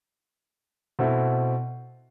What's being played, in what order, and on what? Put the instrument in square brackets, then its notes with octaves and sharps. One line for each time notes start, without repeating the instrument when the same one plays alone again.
[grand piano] B2 A3 C4 E4